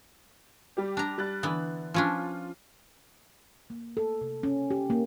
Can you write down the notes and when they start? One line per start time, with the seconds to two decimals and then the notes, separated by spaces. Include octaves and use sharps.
0.77 G3 G4
0.97 D4 A#5
1.18 G3 F#6 A6
1.43 D3 E3 B3
1.94 F3 C#4 D4 F4
3.70 A#3
3.97 A4
4.21 C3
4.43 C#4
4.71 G4
4.90 A#3